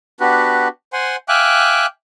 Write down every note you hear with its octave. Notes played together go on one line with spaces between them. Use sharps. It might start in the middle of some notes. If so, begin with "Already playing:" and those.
B3 D4 F#4 G4 B4
C5 F#5 G#5 C6
E5 F5 G5 G#5 D6 F#6